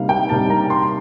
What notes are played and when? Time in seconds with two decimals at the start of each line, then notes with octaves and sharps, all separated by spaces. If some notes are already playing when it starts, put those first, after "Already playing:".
Already playing: C3 G3 A#3 D#4 F5
0.09 G5
0.29 C3 G3 A#3 D#4 A5
0.50 A#5
0.70 C6